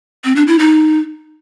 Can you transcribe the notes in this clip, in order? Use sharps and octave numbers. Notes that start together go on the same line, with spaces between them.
C4
D4
E4
D#4